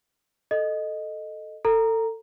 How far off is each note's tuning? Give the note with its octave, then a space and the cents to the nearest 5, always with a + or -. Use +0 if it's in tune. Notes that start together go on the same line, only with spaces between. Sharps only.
A4 +0 D#5 -10
A4 +30 A#5 +0